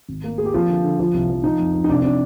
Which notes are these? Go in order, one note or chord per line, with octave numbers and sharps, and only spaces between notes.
G#1
A#3
A#3 G#4
G4
F3 C4 F4
D3
D3
F3 F4
C2
F3
F3 D#4
F2
F3
D#4
C3 D4
C4 D4